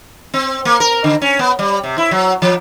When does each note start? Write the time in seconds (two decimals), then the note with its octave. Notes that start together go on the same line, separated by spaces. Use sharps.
0.34 C4
0.65 A#3
0.80 A#4
1.04 D3
1.22 C#4
1.39 B3
1.59 G3
1.84 C3
1.98 E4
2.11 F#3
2.42 F3